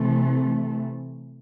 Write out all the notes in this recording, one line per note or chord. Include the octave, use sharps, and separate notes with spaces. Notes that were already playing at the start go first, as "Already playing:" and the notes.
Already playing: C3 E3 A3